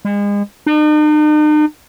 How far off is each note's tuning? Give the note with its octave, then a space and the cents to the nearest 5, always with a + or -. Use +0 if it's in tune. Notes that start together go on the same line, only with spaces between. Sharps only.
G#3 -35
D#4 -45